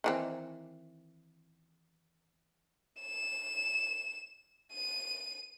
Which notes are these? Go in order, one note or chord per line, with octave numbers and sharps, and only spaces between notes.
D#3 E3 C4
E7
D#7